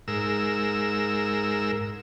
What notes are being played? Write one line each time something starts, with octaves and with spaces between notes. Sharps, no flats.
G#2 A#4 E6